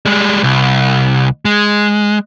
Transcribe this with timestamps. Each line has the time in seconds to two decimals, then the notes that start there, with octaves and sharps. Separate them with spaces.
0.06 G3 G#3
0.43 C2
1.45 G#3